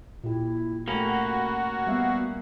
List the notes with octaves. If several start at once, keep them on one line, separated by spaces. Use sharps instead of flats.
A#2 E4 G4
A3 A#3 C#4 F#4 G4 B5
G3 B3 E5 F5